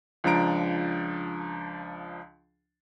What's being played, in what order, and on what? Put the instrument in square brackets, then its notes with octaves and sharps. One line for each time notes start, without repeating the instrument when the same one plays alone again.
[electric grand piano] C#2 F3 D4 A#5 D7